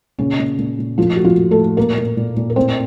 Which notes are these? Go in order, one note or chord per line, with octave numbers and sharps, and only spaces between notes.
A#2 C#3 C#4
A#2
A#2
A#2
A2 F3 F4
A2 F#4
F3 F4
A2
A3 A4
A2
A#2 A#3 A#4
A#2
A#2
A#2
A#4
A2 C4 C5